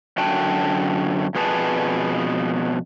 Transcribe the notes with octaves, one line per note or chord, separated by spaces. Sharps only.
F#2 D3 F#4 G5 A5
F2 B2 B3 G#4 B4 A5